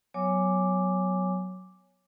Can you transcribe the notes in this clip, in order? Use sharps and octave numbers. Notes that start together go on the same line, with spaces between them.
F#3 B3 C#5 G#5 D6